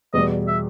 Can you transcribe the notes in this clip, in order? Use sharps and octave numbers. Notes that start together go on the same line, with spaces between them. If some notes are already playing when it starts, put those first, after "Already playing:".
E2 B2 G3 D#5
E5